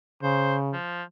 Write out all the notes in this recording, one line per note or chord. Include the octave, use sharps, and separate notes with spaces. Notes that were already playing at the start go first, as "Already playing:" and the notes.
C#3 C5
F3